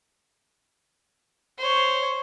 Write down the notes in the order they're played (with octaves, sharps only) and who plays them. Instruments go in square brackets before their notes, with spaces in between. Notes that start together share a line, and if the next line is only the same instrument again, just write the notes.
[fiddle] C5 C#5